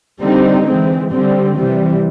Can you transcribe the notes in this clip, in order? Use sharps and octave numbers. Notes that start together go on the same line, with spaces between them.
D3 G3 C4 D#4
E3 G#3 C4
D3 G3 C4
C3 E3 G3